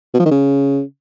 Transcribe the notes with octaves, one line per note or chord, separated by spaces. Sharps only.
B2
F3
D#3
C#3